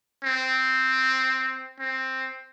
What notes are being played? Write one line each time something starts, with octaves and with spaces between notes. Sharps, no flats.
C4
C4